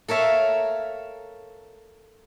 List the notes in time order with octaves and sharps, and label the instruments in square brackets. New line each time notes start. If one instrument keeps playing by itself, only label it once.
[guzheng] A4 A#4 C#5 E5 F5